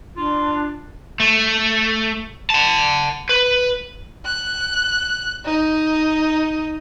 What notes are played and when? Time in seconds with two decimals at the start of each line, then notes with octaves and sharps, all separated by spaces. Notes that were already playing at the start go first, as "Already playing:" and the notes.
0.17 D4 F4
1.20 A3
2.50 F#5 A5
3.29 B4
4.25 F#6
5.45 D#4